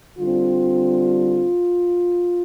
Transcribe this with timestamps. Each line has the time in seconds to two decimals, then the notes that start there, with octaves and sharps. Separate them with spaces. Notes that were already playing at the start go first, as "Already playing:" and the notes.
0.18 D3 G3 C4 F4